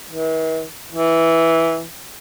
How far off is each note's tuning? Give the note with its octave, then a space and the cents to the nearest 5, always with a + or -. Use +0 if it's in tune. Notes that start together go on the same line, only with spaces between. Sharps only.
E3 -45
E3 -5